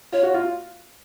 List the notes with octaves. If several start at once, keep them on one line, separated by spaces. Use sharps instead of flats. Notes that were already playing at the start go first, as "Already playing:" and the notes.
F4 C#5
F#4
F4